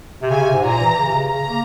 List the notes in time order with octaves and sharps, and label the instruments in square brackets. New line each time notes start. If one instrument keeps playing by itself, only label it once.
[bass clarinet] C3
[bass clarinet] C#3 [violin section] G#5
[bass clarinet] C3
G#2
[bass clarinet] A#2 [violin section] A#5
[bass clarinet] E3
C#3
C3
C#3
[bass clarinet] C#3 [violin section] A#5
[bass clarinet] A#3